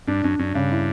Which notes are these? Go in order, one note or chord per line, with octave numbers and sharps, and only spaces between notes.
G2 D4
F#2 D4
F#2 D4
G2 C#3
E4